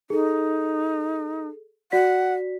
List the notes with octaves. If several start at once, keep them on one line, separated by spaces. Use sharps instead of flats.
D#4 G#4 A4
F#4 D5 F#5 B6